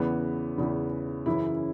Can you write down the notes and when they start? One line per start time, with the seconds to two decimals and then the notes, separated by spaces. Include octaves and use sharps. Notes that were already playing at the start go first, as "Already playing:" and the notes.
Already playing: E2 C#3 E3 B3
0.58 E2 C#3 E3
1.26 F#2 C#3 E3 E4